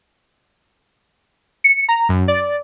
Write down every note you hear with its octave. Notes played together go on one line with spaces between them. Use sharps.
C#7
A#5
F#2
D5